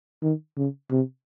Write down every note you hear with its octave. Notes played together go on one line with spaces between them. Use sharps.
D#3
C#3
C3